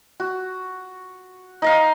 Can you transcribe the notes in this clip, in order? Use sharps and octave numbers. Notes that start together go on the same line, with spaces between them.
F#4
D#4 D#5 F5